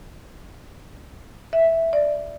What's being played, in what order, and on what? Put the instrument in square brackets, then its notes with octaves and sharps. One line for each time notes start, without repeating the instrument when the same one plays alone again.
[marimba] E5
D5